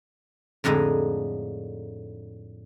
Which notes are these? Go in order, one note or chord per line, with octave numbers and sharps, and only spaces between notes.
F2 A2 D3 G#3 D#4